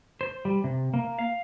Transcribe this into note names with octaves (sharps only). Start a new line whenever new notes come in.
C5
G3
C3
A#3
F5